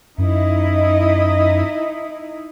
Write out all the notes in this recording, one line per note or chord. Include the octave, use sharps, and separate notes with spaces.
F#2 D#4 E4 D#5